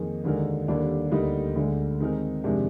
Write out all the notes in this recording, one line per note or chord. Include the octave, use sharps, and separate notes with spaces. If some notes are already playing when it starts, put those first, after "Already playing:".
Already playing: F2 D#3 A#3 D#4 G#4
D#2 D3 G#3 D#4 A#4
D#2 D3 G3 A#3 D4
D2 D3 G3 A#3 D#4
D2 D3 G#3
D#3 G#3 C4 D#4 A#4
F2 C3 D#3 G#3 D4